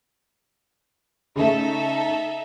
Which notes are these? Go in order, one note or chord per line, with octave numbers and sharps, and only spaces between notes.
C#3 A3 D#4 A4 E5